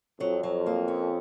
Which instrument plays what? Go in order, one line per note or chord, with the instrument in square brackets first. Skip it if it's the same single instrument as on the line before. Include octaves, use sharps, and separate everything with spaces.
[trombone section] F2 [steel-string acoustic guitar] F#3
[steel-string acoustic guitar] F#3
A#3
C#4